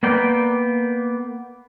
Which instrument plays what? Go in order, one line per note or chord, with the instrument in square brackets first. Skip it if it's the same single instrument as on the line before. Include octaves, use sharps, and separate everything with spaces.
[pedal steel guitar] A#3 B3 D5 G5